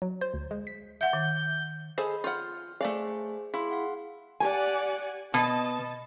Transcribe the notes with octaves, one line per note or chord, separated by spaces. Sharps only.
F#3
C5
D2
G#3
B6
E5 F#5 G6
D#3
G#4 A4 C5 D#5 B5
F4 F#5 F6 G6
A3 G#4 C5 D5 F5 G#5
E4 G#4 F5 C6
F5 F#5
G4 D5 F#5 G#5
B2 D#5 A5